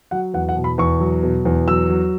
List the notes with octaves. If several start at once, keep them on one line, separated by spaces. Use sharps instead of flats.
F#3 F#5
E2 F#5
F#5
B2
B5
E2 C#6
F#3
B2
E2
F#3 E6
F#3